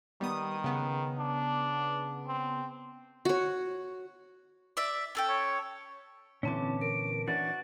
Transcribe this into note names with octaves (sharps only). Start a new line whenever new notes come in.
D#3 G3 B3 D#6
C#3 B3
D4
C4
F#4 C#5
D5 E5
C#4 A4 G5
C#5
A#2 D3 E3 C4 C#4 E4 A5 D6
A#4 D7
E3 C#4 D4 F#4 A6